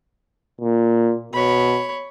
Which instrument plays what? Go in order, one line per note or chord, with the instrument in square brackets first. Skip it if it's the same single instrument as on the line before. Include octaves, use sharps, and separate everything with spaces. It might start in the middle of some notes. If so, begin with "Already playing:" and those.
[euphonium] A#2
[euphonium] B2 [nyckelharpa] C#5 B5